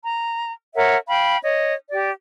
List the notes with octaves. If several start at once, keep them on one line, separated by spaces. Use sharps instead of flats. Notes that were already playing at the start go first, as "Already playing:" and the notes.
A#5
A#4 C#5 E5 F#5
F5 G5 B5
C#5 D#5
G4 D5